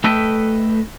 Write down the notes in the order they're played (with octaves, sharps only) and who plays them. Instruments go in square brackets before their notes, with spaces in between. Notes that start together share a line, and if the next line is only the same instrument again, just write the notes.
[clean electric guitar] A3 A4 B4 D#5 E5 G5